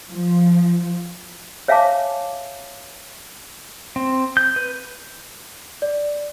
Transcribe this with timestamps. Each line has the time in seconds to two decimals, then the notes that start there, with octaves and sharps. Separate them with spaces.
0.10 F3
1.68 C#5 E5 F5 G#5 A5 D6
3.96 C4
4.37 G6
4.56 B4
5.82 D5